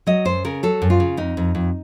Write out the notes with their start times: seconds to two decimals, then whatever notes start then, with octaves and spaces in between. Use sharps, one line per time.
0.07 F#3 D#5
0.25 F#2 C5
0.45 C#3 A#4
0.63 F#3 A4
0.82 F#2
0.90 F4
1.00 C#3
1.17 F2 D#4
1.37 F2
1.55 F2